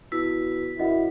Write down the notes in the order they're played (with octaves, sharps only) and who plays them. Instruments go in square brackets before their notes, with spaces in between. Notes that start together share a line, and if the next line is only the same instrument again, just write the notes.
[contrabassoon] B2 [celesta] E4 E6 [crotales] B6
[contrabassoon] F#2 [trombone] E4 [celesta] F#4 D#5 F#5